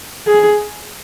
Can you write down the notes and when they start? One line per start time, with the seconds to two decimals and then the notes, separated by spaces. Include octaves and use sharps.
0.27 G#4